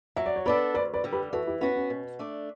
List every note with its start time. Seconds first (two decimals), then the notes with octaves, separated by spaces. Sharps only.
0.16 F#3 E5
0.26 D5
0.36 C#5
0.46 B3 D4 A4 B4 D5
0.74 D2 B4 D5
0.94 B4 D5
1.04 D3 G3
1.13 G4 B4
1.33 E3 F#4 A4
1.47 E4 G4
1.61 B3 C#4 E4 F#4 B4
1.76 C#4
1.90 B2
2.19 A3 D4